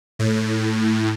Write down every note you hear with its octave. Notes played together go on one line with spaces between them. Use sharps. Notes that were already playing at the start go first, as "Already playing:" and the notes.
A2